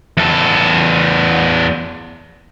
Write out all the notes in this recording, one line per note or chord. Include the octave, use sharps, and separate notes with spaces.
E2 A4